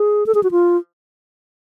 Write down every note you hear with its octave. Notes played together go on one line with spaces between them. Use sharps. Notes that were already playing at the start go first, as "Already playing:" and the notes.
Already playing: G#4
A4
G#4
F#4
F4